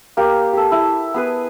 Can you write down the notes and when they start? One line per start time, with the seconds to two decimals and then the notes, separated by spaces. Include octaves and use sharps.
0.17 A#3 G4
0.53 G4 A4
0.72 E4
1.14 B3 G#4 B4